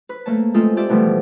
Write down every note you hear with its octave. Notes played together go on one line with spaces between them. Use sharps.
B4
A3 A#3 C#5 A5
G#3 A3 C4 F4 A4
F4 G4 A4 D5 E5
B2 E3 F3 G3 A3